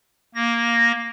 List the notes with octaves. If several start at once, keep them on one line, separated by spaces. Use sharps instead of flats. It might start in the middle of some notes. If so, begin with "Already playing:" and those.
A#3 A#6